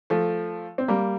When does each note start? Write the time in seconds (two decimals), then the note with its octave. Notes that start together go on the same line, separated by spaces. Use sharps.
0.10 F3 A3
0.78 C4
0.88 G3 A#3